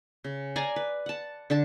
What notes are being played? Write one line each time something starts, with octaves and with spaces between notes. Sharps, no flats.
C#3
D5 F5 G#5 A#5
B4
F#5 A5
D3 D4 A5 D6